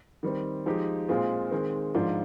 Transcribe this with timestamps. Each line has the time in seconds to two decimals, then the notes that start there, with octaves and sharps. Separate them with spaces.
0.23 D#3 G3 C4
0.66 F3 G#3 D#4 G4
1.09 A#2 G#3 C4 F4 G#4
1.51 D#3 G#3 C4
1.95 G#2 F3 G#3 D4 F4